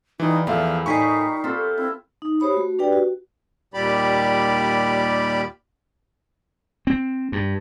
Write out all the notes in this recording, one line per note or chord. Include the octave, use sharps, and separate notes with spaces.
E3 F3 G3 D#4
E2 F3 A3 E4 A#4 E5 F5 G5
A2 G3 D#4 C5 G#5 C#6 B6 C7
C4 F4 G4 A4
C4 E4
D#4
G4 C5 C#5 B5 D#6
A3 F#4
D4 G4 B4 D5 G5
F#4
D#2 A#2 G3 G4 D5 B5
C4
G2